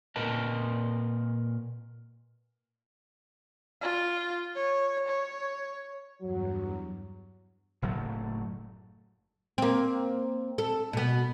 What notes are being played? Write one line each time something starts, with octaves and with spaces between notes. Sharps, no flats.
A#2 A#4 B4 D#5 A5
F4
C#5
C#5
E2 G2 F#3
F#1 A2 F#3 A3
A#3 C4
A4
B2 B3